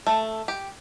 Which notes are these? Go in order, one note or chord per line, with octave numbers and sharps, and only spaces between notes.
A3
G4